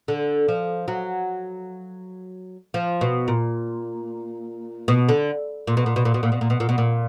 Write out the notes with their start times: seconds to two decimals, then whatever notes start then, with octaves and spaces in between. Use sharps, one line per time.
0.08 D3
0.48 F3
0.88 F#3
2.74 F3
3.01 B2
3.28 A#2
4.88 B2
5.09 D3
5.67 A#2
5.77 B2
5.86 A#2
5.96 B2
6.05 A#2
6.14 B2
6.23 A#2
6.32 B2
6.41 A#2
6.50 B2
6.60 A#2
6.69 B2
6.78 A#2